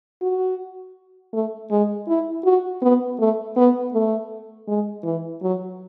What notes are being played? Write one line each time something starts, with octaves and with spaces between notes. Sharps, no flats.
F#4
A3
G#3
E4
F#4
B3
A3
B3
A3
G#3
E3
F#3